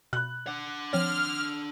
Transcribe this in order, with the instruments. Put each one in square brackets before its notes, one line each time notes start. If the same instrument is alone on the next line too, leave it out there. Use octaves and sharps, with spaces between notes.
[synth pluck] B2 B5 [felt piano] F#6
[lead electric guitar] D4 F#5
[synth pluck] F3 C4 C#5 [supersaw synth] F6